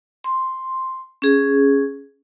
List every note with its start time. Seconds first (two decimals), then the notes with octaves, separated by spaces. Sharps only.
0.24 C6
1.22 C#4 G#4